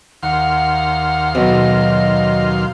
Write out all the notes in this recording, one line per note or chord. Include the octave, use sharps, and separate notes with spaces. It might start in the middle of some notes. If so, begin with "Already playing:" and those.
D#2 F5 F#5 C6
B1 D#5